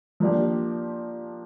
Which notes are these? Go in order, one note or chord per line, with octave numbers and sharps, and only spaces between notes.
F3 A#3 D4 G4